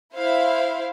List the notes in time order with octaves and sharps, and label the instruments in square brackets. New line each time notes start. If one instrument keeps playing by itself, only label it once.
[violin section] E4 C5 F5